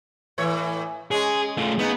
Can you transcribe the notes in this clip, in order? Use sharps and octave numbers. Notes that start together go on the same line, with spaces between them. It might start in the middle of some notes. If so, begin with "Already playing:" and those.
A2 E3 C#5
G#3 C#4 G#4
A3 F4
C#3 B3 D#4